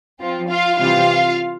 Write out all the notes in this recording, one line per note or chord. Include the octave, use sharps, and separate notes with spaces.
F3 C4 F4
F4 F5
C3 E3 G3 C4 F4 F5